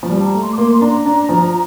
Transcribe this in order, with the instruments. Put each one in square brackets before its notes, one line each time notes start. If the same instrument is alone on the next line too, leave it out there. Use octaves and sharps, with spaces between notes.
[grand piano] F3
G3
[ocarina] A5
A#5
[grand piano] A3
[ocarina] C6
D6
[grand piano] A#3 [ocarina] C6
[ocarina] C6
[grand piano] D4 [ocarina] A#5
[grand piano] D4
F3